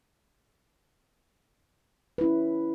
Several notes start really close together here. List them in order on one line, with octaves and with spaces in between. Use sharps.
B4 E4 C#4